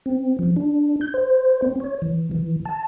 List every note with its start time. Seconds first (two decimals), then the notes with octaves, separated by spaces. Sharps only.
0.06 C4
0.39 F3
0.56 D4
1.01 G6
1.14 C5
1.62 C4
1.80 C#5
2.02 E3
2.31 E3
2.65 A5